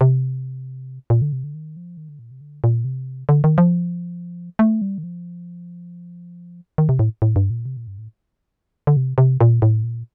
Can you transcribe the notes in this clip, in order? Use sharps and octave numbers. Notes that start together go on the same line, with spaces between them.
C3
A#2
D3
C3
D3
D#3
F3
D#3
D3
A#2
C3
D3
A#2
C3
D3
D#3
F3
A3
G3
D#3
F3
D#3
C3
A2
A2
G2
A#2
C3
A#2
G2
A2
D3
C3
C3
A#2
A2
A#2